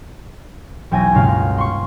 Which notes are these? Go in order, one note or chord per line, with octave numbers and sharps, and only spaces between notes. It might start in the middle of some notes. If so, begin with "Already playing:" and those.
E1 B1 G5 G#5 A#6
C#2 G2 B2 A#3 F4 F5
C6 C#6